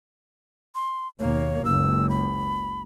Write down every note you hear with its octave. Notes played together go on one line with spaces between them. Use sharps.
C6
D#2 B2 A#3 C#5
F#1 C#2 E6
B5